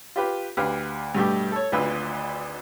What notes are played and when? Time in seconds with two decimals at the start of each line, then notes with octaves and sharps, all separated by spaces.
0.16 F4 G4 B4
0.57 D2 G4 B4 F5
1.15 G2 B2 A3 G4
1.52 A4 C#5
1.72 G#1 D2 F4 B4 E6